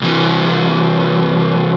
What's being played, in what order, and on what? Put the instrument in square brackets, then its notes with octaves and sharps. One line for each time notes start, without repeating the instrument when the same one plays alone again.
[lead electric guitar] C2 E3